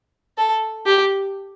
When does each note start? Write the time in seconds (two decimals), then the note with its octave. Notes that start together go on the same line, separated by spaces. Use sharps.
0.38 A4
0.86 G4